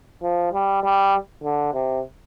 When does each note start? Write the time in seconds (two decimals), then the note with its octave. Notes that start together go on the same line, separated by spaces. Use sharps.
0.22 F3
0.53 G3
0.83 G3
1.43 D3
1.73 C3